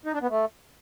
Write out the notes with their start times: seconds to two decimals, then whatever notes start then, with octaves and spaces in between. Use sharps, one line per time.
0.06 D#4
0.14 D4
0.22 B3
0.30 A3